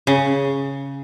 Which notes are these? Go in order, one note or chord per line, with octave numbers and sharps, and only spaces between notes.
C#3